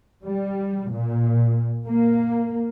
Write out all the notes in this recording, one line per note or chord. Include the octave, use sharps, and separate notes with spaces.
G3
A#2
A#3